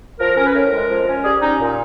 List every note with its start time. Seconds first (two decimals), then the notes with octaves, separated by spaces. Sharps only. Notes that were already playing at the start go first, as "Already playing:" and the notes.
0.19 F3 A#4
0.37 C#4 A#4
0.46 B4
0.54 A2 A#4
0.72 G#3
0.89 F3
1.07 C#4
1.24 G3 G#4
1.42 C#4 D#4
1.60 A#2